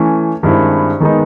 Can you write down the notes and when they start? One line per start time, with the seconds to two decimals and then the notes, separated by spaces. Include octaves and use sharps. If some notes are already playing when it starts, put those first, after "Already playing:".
Already playing: E3 A3 C#4
0.43 G2 D#3 G#3 C4 E4
1.00 D#3 G#3 B3 D#4